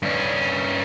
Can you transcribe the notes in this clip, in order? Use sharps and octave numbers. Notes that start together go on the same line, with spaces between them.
G2 C#4